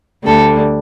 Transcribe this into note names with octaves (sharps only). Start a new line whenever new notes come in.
D2 D3 G3 A4